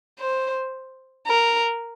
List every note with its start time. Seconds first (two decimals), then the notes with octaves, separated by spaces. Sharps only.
0.19 C5
1.27 A#4